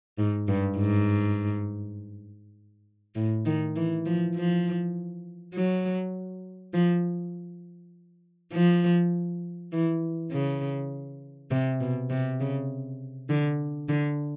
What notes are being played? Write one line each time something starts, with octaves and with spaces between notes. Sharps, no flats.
G#2
G2
G#2
A2
D#3
E3
F3
F3
F#3
F3
F3
E3
C#3
C3
B2
C3
C#3
D3
D3